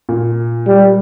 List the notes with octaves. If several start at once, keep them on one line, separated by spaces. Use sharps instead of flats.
A#2
G3